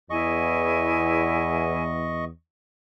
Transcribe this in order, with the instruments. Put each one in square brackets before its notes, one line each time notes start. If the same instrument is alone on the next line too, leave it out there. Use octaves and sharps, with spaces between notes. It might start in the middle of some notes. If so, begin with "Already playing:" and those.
[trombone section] E2 [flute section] E4 G#4 G#5 [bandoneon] D#5 C#6